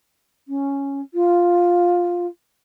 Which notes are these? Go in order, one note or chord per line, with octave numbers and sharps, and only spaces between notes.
C#4
F4